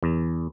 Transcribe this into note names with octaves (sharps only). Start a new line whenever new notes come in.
E2